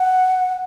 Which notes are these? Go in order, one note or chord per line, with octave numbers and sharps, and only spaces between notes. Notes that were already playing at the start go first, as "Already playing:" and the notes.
Already playing: F#5